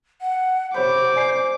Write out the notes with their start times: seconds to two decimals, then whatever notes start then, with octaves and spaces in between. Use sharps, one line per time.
0.21 F#5
0.74 C3 C5 C#5 B5 D6 G6
1.15 D5 G#5 C7